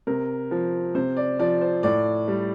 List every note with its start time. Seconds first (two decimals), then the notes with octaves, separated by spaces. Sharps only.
0.07 C3 A#4
0.51 F3
0.95 C3 C5
1.17 D5
1.39 F3 D5
1.61 C5
1.83 A2 D5
2.28 G3